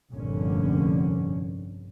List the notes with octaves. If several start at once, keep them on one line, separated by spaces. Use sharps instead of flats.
F1 A#1 G2 A#2 D3 C#4